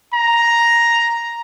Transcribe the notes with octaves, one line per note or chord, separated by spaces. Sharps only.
A#5